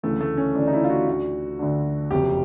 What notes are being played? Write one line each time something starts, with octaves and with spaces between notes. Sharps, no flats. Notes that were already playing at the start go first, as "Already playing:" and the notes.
D2 C#3 E3 A3
A3
C#4
D2 C#3 E3 D4
D#4
E4
F4
F#4
D2 D3
D2 D3
F#1 F2 C3 G4